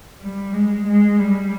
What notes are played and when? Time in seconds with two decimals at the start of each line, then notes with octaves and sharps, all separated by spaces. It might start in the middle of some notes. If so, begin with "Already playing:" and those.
0.21 G3
0.53 G#3
0.87 G#3
1.19 G3